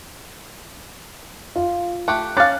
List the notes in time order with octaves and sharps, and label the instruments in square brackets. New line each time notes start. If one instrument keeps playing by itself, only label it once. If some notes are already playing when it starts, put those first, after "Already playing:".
[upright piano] F4
[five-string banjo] A3 G4 [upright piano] F#6
[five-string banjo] C#4 F5 [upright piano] D6 F#6 A6